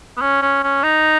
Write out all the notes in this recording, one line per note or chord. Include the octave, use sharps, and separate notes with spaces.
B3
C#4
C#4
C#4
D#4